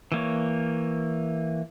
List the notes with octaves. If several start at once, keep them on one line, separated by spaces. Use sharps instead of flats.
E3 A#3 C#5